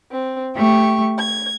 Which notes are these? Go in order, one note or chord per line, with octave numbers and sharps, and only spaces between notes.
C4
A3 G4 C#6
G#6